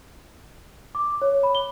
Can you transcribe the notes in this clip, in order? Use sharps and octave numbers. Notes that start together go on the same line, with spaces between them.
D6
C#5
B5
G7